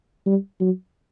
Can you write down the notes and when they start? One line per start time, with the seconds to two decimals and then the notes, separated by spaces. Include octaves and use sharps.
0.26 G3
0.61 F#3